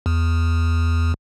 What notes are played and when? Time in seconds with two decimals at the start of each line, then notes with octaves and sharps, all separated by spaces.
0.06 E2